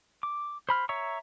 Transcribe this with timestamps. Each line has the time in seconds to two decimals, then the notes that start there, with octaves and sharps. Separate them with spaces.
0.23 D6
0.69 C5 B5 F6
0.89 C#5 E5 A#5 C#6 E6